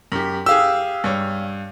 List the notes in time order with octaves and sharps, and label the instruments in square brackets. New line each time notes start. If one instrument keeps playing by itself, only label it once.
[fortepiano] F#2 G4
[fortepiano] G4 G#4 [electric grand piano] F5 E6
[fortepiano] G2 C#5